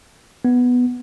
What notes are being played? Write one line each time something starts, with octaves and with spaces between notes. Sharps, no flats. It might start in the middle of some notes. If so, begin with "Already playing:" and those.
B3